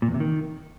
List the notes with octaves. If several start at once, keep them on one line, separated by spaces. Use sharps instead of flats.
A#2
E2
C3
D#3